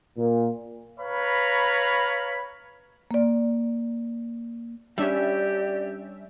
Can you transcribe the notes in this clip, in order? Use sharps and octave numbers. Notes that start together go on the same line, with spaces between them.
A#2
B4 C#5 F5 A#5 B5
A#3 D5
G3 C#4 D4 G4 D5 E5